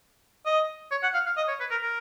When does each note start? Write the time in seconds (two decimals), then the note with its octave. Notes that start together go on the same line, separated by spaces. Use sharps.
0.46 D#5
0.91 C#5
1.03 F#5
1.14 F5
1.26 F5
1.37 D#5
1.48 C#5
1.60 B4
1.71 A#4
1.83 A#4